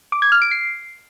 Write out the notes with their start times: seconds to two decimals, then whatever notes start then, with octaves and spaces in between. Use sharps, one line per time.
0.12 D6
0.22 G#6
0.32 F6
0.42 D7
0.51 C7